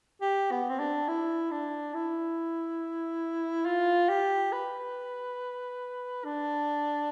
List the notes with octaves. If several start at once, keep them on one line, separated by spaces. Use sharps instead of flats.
G4
B3
C4
D4
E4
D4
E4
F4
G4
B4
D4